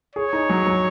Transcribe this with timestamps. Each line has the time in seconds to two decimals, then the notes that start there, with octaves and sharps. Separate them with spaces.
0.16 G#4 C#5
0.33 D#4
0.49 F#3
0.67 F#3